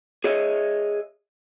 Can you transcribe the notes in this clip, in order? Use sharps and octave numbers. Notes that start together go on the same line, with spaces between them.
G#4 C#5 D#5 E5